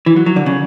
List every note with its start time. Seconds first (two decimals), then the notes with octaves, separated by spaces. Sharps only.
0.06 E3
0.16 F#3
0.26 F#3
0.36 D3
0.46 C#3